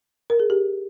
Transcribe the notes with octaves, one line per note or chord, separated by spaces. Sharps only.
A#4
G#4
G4